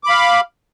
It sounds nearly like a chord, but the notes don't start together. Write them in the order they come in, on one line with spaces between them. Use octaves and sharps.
D6 B5 F5